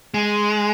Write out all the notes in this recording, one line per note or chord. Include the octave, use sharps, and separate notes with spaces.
G#3